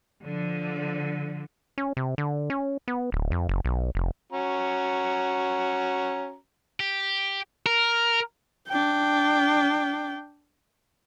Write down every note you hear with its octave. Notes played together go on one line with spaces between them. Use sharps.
D3 F3
C#4
C3
D3
C#4
B3
D1
F2
F#1
B1
F1
C#4 F#4 A#5
G4
A#4
D4 G5